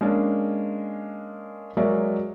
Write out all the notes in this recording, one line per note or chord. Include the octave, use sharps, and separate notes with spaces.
G#3 A#3 C#4 D4
F#3 G#3 A#4 C#5 D5 E5